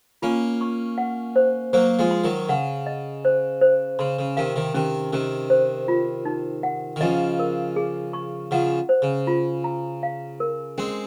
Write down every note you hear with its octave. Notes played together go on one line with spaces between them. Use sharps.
A#3 C#4 F4
C#6
F#5
C5
F#3 A#3 C5
F3 G#3
C6
D#3 F#3
C#3 F#5
D#5
C5
C5
C#3 C6
C#3
C3 D#3 F5
C3 D#3
C3 D#3 C#4
C3 D#3 C#4
C5
F4
D#4
F#5
D#3
C#3 F3 D#5
A#4
G#4
C#6
C#3 F3 F#5
C5
C#3
F4
A#5
F5
A#4
G#3 C4 C#4